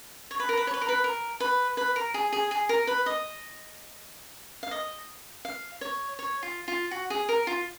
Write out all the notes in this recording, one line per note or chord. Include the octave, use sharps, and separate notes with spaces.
C#5
B4
A#4
B4
C#5
B4
A#4
B4
A#4
B4
B4
A#4
G#4
G#4
G#4
A#4
B4
D#5
F5
D#5
F5
C#5
C#5
F4
F4
F#4
G#4
A#4
F4